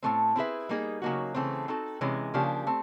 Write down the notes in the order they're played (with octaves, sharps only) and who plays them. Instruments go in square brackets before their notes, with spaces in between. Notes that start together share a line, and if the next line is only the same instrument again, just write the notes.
[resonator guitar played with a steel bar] A2 F3 A3 C4
C4 E4 G#4 B4 E5
G3 A#3 D#4 G#4
C#3 F#3 A#3 D#4 F#4
C#3 E3 A3 C4
C4 D#4 F#4 A4
C3 E3 G#3 C#4
C#3 F3 A#3 D4 G4
A3 C4